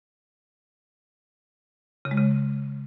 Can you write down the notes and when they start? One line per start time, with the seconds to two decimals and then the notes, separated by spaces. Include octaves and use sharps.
2.05 C#3
2.11 G#3
2.17 C#3